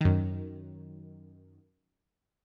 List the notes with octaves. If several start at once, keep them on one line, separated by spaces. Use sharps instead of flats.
F#2 D#3